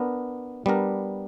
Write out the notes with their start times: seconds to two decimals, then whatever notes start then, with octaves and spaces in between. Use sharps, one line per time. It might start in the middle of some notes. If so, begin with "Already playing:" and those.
Already playing: B3 D4 A#4
0.66 G3 B3 D4 A#4